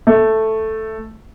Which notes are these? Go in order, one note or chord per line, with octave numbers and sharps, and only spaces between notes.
A3